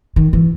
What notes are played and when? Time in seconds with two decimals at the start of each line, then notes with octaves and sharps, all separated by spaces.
0.16 D#3
0.33 E3